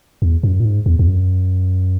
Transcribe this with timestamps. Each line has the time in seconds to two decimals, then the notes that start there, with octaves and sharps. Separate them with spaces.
0.22 E2
0.43 F#2
0.60 A#2
0.65 G#2
0.86 E2
0.99 E2
1.07 F#2